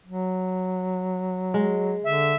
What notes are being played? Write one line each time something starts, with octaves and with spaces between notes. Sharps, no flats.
F#3
G#3
D3 E5